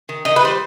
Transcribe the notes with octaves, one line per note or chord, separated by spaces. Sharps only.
D#3
D#3 D#5
B4
G3 C5